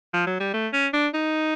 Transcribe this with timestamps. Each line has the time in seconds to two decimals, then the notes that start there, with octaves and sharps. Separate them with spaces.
0.14 F3
0.27 F#3
0.40 G3
0.54 A3
0.73 C#4
0.94 D4
1.14 D#4